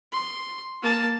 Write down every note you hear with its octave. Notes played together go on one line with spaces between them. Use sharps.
C6
A#3 A5